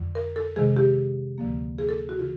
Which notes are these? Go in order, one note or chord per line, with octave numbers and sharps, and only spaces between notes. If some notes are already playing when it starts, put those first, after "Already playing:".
Already playing: F2 D3 F#3
A#4
A4
C3 D#3 G#3 G#4
G4
D2 D3 F3 A#3
G#4
A4
F#4
C#3 E3 F4